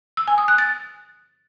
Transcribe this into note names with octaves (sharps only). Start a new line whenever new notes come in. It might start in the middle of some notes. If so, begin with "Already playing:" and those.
E6
G#5
D#6
F#6
A6